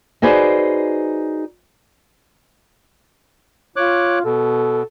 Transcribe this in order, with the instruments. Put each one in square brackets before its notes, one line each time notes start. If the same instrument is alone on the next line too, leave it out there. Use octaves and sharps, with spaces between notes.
[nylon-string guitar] D#4 F#4 G#4 B4 C5 D5
[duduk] F4 [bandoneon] C#5 D6 F#6
[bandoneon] B2 [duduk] A4